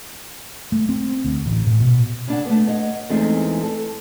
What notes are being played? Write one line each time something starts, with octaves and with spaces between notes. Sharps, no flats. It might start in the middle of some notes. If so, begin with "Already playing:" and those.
A3
C4
D2
A1
A2
B2
C#3 D4 F#5
A3 B3
C#5 D#5 F#5
E2 E3 G#3 A3 C4 D#4
A4